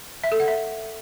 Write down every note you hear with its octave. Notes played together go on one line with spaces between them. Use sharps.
E5
A4
F#5
E5